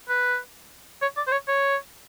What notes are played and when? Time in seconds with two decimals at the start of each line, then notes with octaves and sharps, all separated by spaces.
0.08 B4
1.02 C#5
1.17 D5
1.27 C5
1.32 C#5
1.48 C#5